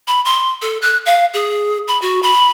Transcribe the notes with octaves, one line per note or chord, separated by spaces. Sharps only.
B5
C6
A4
F#6
F5
G#4
B5
F#4
B5